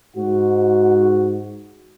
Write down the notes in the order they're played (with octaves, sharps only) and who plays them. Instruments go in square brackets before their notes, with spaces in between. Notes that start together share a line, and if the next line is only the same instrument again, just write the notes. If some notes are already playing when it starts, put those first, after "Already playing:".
[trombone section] G#2 F#4